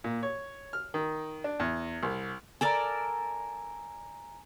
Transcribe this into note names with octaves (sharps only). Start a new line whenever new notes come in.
A#2
C#5
F6
D#3
D4
E2
C2
A4 A#4 D5 G#5 A#5